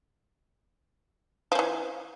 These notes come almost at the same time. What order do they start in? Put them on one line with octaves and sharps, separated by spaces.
F3 C#4 E3